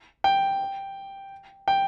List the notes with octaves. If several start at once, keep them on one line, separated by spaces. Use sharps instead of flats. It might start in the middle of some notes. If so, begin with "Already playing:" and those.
G5
G5